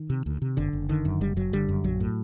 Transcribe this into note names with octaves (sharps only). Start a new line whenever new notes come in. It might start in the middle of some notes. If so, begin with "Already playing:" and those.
Already playing: D#3
C3
D2
C3
F#1 D3
F#1
D3 D#3
F#2
F#1 G3
F#1 F#3
D3 G3
F#2
A#1 F#3
A2